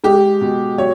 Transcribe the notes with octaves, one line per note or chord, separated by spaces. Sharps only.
G#3 G4
B2
F#3 C#5